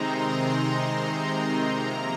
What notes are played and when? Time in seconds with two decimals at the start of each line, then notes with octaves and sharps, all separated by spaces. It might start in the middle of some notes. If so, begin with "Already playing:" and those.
Already playing: C3 D#3 G#3 C4 D#4 A#5 C6
0.12 A#5
1.77 C3 F3 A#3 A#5